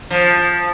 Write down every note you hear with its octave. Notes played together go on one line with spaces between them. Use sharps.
F3